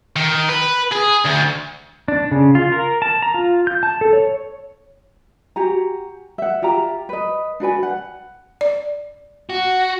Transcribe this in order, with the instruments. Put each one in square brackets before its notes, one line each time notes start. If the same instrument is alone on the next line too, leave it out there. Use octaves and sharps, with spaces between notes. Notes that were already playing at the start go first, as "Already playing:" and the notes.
[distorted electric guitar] D#3
B4
G#4
D2
[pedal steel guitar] D4
C#3
F4
A#4
A5
A#5
F4
G6
A5
A4
C#5
[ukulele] F#4 G4 G#5 A#5
E5 F#5
F4 G4 E5 A#5
B4 D#5
D4 F#4 B4 G#5
F#5
[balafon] D5
[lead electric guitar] F#4